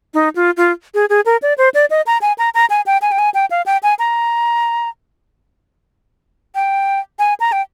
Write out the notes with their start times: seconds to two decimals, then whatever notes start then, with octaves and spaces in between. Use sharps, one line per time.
0.14 D#4
0.36 F4
0.57 F4
0.94 G#4
1.10 G#4
1.26 A#4
1.42 D5
1.58 C5
1.74 D5
1.90 D#5
2.07 A#5
2.22 G#5
2.38 A#5
2.54 A#5
2.70 G#5
2.86 G5
3.02 G#5
3.12 G5
3.19 G#5
3.34 G5
3.51 F5
3.66 G5
3.83 G#5
3.99 A#5
6.55 G5
7.19 G#5
7.40 A#5
7.52 G5